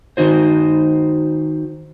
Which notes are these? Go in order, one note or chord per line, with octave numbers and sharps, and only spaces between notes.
D#3 D#4 F#4 C5